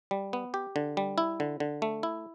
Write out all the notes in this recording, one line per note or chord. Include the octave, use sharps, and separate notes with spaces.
G3
B3
G4
D3
G3
E4
D3
D3
A3
E4